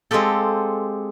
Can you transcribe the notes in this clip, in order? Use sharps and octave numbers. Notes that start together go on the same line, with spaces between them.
G#3 C4 F4 G4 A4